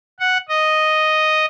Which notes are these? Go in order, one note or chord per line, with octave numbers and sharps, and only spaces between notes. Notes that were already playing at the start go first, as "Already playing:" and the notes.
F#5
D#5